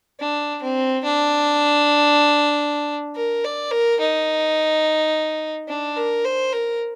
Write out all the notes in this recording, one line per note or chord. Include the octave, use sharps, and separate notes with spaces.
D4
C4
D4
A#4
D5
A#4
D#4
D4
A#4
C5
A#4